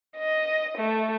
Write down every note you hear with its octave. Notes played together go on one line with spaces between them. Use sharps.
D#5
A3